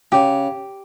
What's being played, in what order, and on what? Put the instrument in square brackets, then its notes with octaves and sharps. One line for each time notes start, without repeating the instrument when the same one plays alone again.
[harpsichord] C#3 [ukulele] G4